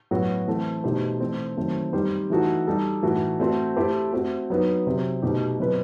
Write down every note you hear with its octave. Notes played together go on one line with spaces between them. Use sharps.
A2 F#3 B3 F#4
E3 A3 C4
B2 A3 D#4 G4 C5
E3 A3 C4
D#3 F#3 A3 C4
G3 C4 D#4 G4 C5
E3 A3 D#4 F#4 A4
G3 D#4 A4
A2 E3 A3 D#4 F#4
A3 C4 F#4 C5
A3 E4 G4 C5
A3 C4 F#4
F#3 B3 D#4
C3 F#3 C4
B2 A3 D#4 G4
B2 F#3 C4 E4 B4